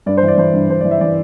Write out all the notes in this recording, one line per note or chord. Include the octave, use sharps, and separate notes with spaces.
G2 D5
C5
E3
D5
E3 C5
G2
G2 C5
D5
E3
E5
E3 D5